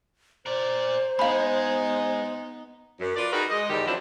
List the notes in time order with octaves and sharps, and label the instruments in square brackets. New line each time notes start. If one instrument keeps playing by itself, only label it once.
[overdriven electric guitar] A#4 D5 [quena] C5
[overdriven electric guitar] G#3 [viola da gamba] B3 D#4 [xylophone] F5 B5
[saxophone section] F#2
F4 B4 D5
D#4 F#4 G#4 A#4 B4
G#3 D#5
E2 G#2 D3 D#3 G4
F3 F#3 C4 D4 E4